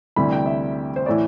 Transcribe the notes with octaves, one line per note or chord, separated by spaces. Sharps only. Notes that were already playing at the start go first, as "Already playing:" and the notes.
D2 C3 E3 G3 B5
G5
E5
C5
A2 E3 D5